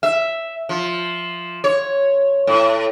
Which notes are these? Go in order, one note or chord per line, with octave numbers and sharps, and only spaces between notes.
E5
F3
C#5
A2